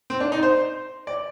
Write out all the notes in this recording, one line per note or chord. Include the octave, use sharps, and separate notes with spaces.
C4
D4
D#4
C5
D5